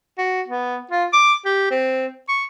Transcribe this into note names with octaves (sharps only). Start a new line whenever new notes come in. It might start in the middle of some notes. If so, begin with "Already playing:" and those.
F#4
B3
F4
D6
G4
C4
C#6